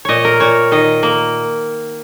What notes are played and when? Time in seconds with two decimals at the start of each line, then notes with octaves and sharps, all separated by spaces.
0.05 A#2 C#5 D#5
0.25 A#4
0.40 A#2 C#5
0.71 D#3 D#5
1.03 A#3